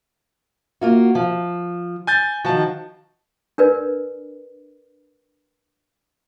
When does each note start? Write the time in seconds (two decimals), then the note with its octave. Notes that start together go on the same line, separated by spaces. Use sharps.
0.81 A#3 F4 F#4
1.15 F3
2.07 G#5 G6 A6
2.45 D#3 F3 F#4 A5
3.58 D4 A#4 B4 D5